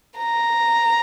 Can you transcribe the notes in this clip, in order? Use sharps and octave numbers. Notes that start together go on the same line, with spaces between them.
A#5